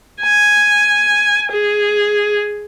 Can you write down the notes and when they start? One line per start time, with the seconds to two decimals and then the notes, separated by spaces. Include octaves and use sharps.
0.22 G#5
1.52 G#4